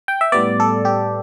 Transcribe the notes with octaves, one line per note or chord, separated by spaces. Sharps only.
G5
E5
A2 G3 B3 D5
A4
G4